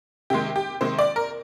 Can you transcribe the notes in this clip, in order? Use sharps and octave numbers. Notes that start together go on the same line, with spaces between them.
C3 D#3 G#3 G4
G4
C3 D#3 G#3 C5
D5
A#4